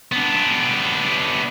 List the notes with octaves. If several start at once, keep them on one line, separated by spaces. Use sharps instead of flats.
B3 D4